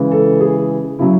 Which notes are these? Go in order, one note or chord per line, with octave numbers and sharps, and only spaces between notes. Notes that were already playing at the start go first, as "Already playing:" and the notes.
Already playing: C#3 E3 G#3
A4
G#4
C#3 F#3 E4